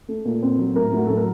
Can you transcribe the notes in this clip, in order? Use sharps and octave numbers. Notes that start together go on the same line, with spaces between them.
A3
A#2
C4
F#3
A2 A#4
A2 F#4
F#3 A4
A#4